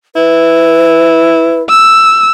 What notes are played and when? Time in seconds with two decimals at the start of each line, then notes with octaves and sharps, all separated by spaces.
0.16 E4 B4
1.69 E6